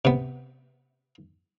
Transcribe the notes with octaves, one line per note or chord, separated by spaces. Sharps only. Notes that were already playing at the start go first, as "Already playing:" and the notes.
C3 B3